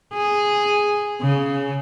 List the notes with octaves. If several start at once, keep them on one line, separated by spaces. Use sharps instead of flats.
G#4
C#3